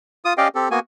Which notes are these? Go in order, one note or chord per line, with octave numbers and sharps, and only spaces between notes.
F4 D#6
C#4 G4 D5 D#5 F5 G5
C4 G4 A4
A#3 B3 F#4 G#5